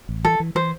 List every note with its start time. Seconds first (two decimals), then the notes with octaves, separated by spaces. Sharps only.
0.09 A1
0.24 E3 A4
0.40 E3
0.55 E3 C5